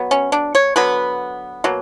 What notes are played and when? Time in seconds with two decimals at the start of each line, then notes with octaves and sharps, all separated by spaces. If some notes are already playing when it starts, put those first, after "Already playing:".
Already playing: F#3 B3
0.11 C#4
0.32 D4
0.55 C#5
0.76 D3 F#3 B3 B4
1.64 B2 F#3 A#3